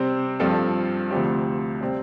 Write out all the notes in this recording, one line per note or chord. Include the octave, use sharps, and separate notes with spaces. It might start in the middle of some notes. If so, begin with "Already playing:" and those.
Already playing: C3 G3 C4 G4 C5
G2 F3 C4 F4 A4
D2 C3 F3 C4 G4
C3 G3 C4